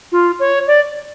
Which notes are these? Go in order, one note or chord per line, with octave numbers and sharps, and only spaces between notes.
F4
C#5
D5